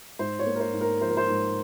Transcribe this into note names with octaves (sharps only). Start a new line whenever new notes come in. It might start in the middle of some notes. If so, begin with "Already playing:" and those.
G#2 C5
C#5
A#3
A#4
C5
G#2
A#4
F3 C5
A#4
C5
G#2